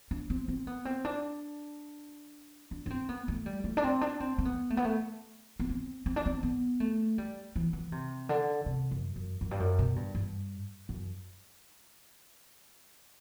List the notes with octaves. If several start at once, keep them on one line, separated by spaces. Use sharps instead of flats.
D4
C4
C4
B3
C4
D4
D4
D4
C4
B3
A3
G3
A3
D4
C4
D4
C4
C4
B3
A3
B3
A3
B3
C4
C4
D4
C4
B3
A3
G3
E3
E3
C3
D3
C3
F#2
F#2
F#2
G2
F#2
B2
G2
G2
F#2